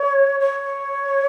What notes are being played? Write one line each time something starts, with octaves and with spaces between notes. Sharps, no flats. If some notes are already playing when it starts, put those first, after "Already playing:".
Already playing: C#5
C#5